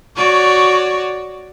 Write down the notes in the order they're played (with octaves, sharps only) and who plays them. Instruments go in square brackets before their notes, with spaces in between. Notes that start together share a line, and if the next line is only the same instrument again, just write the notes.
[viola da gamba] F#4 C#5 D5